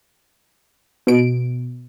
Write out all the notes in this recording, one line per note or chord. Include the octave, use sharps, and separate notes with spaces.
B2 D7